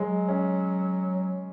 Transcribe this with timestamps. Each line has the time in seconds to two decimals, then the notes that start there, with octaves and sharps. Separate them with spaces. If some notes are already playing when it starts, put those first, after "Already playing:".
Already playing: F#3 G#3
0.28 C#4